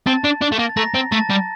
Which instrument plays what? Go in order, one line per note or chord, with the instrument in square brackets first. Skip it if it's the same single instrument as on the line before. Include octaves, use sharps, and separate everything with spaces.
[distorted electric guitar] C4 [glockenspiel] A5 A6
[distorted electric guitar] D4
D4
A3
A#3
[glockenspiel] A6
[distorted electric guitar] A3 [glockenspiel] A#5 A#6
[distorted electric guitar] C4
[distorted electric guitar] A3 [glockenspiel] A5 A6
[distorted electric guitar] G3